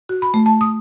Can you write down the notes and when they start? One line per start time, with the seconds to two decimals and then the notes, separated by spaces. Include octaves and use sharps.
0.09 F#4
0.22 B5
0.34 A3
0.46 A5
0.61 D#6